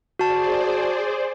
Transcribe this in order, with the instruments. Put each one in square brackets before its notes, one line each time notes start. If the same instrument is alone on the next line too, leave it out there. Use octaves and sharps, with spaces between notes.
[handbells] F#4 A5 [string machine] G#4 C5 D5